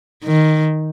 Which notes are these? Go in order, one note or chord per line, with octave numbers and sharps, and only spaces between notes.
D#3